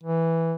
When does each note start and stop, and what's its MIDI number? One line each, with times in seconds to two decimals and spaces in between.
0.04 0.55 52